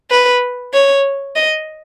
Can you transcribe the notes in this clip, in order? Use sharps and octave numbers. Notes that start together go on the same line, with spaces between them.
B4
C#5
D#5